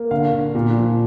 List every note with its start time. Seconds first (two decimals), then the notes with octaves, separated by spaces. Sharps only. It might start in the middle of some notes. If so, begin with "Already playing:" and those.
Already playing: A#3
0.11 D3 F5
0.33 D3
0.55 A#2
0.76 F3